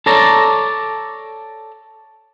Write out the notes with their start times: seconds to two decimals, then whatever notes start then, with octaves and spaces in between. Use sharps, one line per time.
0.06 A4 C#5 D5 A#5